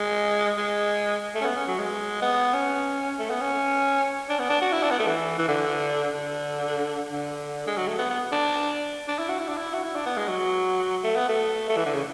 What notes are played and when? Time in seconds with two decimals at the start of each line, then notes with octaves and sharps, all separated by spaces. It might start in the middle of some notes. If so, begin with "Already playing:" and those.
Already playing: G#3
0.58 G#3
1.35 A3
1.42 C#4
1.45 B3
1.56 C#4
1.68 F#3
1.79 G#3
2.22 B3
2.54 C#4
3.19 A3
3.30 B3
3.41 C#4
4.29 D4
4.39 B3
4.50 D4
4.62 F#4
4.72 E4
4.83 D4
4.91 B3
4.99 A3
5.07 E3
5.39 E3
5.49 D3
6.14 D3
7.12 D3
7.67 G#3
7.77 F#3
7.88 A3
7.99 B3
8.10 B3
8.32 D4
9.08 D4
9.19 E4
9.29 F#4
9.39 E4
9.48 D4
9.58 E4
9.74 F#4
9.84 E4
9.96 D4
10.06 B3
10.17 G#3
10.28 F#3
11.04 A3
11.16 B3
11.29 A3
11.69 A3
11.77 E3
11.86 D3
11.94 C#3